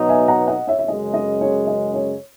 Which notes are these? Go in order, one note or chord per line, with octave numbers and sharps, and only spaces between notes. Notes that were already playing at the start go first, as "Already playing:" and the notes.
Already playing: B2 F#3 B3 D#4
E5 G#5
F#5 A#5
D#5 F#5
C#5 E5
E5
F#2 C#3 G#3 D#5
D#5
C#5
D#5
C#5